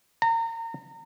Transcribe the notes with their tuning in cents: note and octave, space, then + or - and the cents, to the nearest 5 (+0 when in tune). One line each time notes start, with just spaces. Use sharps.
A#5 -30